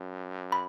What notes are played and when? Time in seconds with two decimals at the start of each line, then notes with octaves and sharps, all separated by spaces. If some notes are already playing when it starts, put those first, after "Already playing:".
Already playing: F#2
0.52 B5